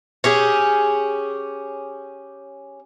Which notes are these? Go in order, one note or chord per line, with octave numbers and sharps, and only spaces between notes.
C#4 G4 G#4